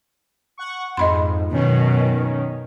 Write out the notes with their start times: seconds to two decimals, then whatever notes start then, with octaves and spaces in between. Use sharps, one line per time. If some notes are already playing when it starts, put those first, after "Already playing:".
0.58 F#5 C#6
0.97 F2 G#2 D#5 B5 C6
1.52 F#2 B2 D#3 C#4